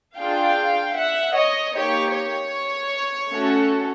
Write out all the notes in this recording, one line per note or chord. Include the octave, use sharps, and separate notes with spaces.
D4 F4 G#4 F5 G5
E5 F#5
C#5 D#5
A#3 D#4 G4 C#5
C#5
A3 C#4 F#4 A4